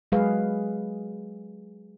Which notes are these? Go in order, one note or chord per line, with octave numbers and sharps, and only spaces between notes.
F#3 G#3 G#4 B4 F5